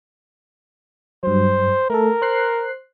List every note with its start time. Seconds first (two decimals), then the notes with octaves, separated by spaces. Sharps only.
1.23 G2 F#3 C5
1.90 A3 A4 A#4
2.22 C5 F#6 C7